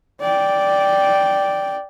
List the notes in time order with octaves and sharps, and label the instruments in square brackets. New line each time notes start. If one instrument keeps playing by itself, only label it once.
[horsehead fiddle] D5 G5